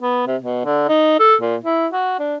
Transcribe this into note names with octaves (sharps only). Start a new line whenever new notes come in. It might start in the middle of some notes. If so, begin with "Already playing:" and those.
B3
C3
B2
D3
D#4
A4
A#2
E4
F#4
D4